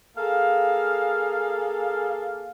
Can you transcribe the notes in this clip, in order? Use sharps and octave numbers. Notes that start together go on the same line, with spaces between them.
A#3 G#4 A4 F5